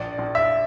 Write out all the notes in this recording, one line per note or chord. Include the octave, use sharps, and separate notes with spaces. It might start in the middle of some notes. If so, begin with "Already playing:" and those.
Already playing: A#1 D5
A#1
E5